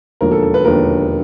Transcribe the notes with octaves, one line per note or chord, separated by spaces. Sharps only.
E1 D#2 D3 F3 A#4
A4
A4
B4
E1 D#2 D3 F3 A#4